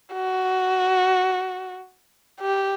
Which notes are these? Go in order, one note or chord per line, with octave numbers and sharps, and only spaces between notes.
F#4
G4